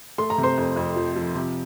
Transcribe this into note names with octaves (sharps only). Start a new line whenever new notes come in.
A3 C6
A#5
C3
C5 C6
F2
F2
F3
F3
C3